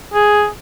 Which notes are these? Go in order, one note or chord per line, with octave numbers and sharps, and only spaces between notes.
G#4